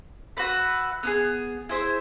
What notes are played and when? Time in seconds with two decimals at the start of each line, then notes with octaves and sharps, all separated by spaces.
0.37 F#4 B4 E5
1.03 B3 E4 G#4
1.69 E4 G#4 C5 E5